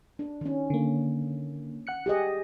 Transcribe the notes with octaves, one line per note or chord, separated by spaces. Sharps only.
D4
D#3 C#4
D3 A#3
F#5 F#6 C#7
G4 G#4 D#5